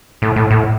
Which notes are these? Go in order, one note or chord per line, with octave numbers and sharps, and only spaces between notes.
A2
A2
A2